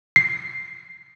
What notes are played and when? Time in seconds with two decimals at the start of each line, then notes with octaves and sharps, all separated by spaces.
0.16 C7